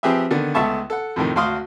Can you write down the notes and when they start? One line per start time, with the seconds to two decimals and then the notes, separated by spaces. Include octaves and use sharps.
0.03 F3 C4 G4 G#4 B4 E5
0.31 D3 D#3 B3
0.54 C#2 A3 B3 E5 A5 C#6
0.90 A4 F#5
1.16 F2 A2 C3 D#3
1.35 G#1 D2 F#4 F5 C6 D#6